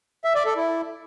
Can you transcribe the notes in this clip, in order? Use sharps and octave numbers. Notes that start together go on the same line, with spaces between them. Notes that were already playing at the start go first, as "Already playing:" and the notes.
E5
D5
A4
E4